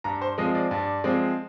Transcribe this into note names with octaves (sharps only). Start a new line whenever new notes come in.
G2 A#5
C5
F3 G#3 C4 D#5
D5
G2 D5
F3 G#3 C4